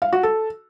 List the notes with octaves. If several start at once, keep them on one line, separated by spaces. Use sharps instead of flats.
F5
F#4
A4